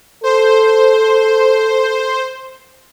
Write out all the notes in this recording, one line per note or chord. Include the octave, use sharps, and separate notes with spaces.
A4 C5